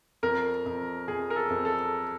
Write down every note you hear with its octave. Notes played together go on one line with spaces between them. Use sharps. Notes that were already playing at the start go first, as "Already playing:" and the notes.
F2 A#4
F2
F2 G#4
A#4
A4
F2
A4